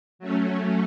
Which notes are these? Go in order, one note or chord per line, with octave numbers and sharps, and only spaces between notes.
F#3 A3 C#4